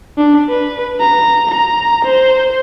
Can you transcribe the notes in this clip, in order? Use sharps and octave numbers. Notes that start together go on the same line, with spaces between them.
D4
B4
A#5
A#5
C5